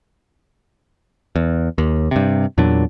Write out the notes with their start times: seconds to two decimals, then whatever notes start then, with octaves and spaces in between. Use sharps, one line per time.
1.36 E2
1.78 D#2
2.11 G2 C3
2.58 E2 A#2 F#3 D4